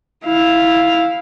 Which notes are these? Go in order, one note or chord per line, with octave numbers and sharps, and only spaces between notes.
E4 F5